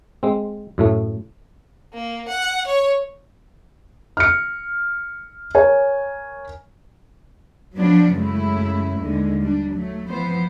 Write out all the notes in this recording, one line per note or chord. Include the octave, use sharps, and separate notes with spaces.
G#3 C4
F#2 A2 A3
A#3
F#5
C#5
F6 C#7
A#4 C#5 G#5
F3 F#3 B3 D4
F#2 C#3 G#3 A3 E4
D#2 D3 G#3
G3 D4
F#3 A3
E3 F3 B3 C5